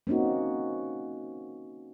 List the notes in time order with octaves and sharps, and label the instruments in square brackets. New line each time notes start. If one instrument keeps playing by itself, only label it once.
[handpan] A#3 C4 C#4 D#4 F#4